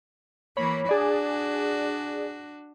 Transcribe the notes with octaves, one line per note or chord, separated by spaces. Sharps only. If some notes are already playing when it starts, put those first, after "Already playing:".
E3 A#3 C#5 B5
D4 F#4 G#4 D5